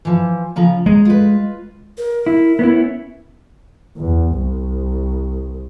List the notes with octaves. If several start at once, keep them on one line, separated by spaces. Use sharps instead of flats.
E3 F3
C#3 F3 A#5
G#3 A#5
F4 B4
A#4
E4
B3 C#4 E4
E2
C2